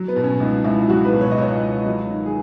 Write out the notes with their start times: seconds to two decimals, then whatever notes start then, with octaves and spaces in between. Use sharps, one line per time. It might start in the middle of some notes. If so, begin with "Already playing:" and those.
Already playing: F#3
0.08 B3
0.16 B2
0.24 C#4
0.40 C#2 D#4
0.64 C#2 E4
0.88 F#3 F#4
1.05 B4
1.13 B2
1.21 C#5
1.31 D#5
1.38 C#2 C#5
1.62 C#2
1.86 F#3
2.11 D#3
2.26 G#4